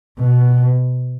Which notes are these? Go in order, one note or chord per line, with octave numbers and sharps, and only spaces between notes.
B2